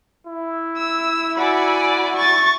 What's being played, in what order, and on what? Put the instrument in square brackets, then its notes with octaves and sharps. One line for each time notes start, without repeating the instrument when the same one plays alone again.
[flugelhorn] E4
[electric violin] E6
[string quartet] F#4 D5 G#5 [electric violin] B5
[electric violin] C#6 A6